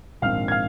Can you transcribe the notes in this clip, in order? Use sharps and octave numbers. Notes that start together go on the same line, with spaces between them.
A#1 G#2 D#3 C4 F5 F6
G#6
F5 F6